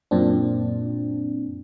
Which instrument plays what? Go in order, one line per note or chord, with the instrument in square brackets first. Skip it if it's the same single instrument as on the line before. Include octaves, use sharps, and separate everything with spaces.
[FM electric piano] F#2 A#2 C4 D4